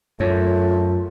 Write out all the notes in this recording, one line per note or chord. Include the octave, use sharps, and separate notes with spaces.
F#2 A3 F4 C#5 D5